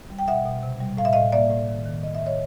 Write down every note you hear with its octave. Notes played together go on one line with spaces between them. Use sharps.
G3
G5
B2 E5 F#5
B2
C3
G3
A2 F5
E5
A2 D#5 F5
A#3 D5 E5
A2
D#3
D#3
A2 D#5
E5
A2
C#5 D#5